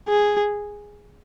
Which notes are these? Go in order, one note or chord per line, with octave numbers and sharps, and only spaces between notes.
G#4